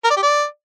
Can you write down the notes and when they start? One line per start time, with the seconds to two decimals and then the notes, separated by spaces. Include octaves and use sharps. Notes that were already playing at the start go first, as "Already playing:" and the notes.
0.05 A#4
0.11 D5
0.17 G4
0.23 D5